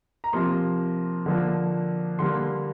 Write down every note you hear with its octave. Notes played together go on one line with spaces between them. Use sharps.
A#5
C3 F3 A#3 C6
D3 F3 A#3
D3 G3 A#3 C6